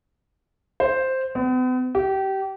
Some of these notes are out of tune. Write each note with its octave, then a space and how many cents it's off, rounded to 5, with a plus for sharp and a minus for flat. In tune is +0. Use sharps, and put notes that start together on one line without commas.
C5 +0
B3 +45
G4 -25